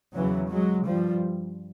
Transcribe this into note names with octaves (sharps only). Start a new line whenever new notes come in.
E2 C#3 E3 F#3
F#3 G#3
G2 F3 G3